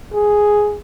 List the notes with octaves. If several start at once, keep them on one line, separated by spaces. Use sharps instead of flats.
G#4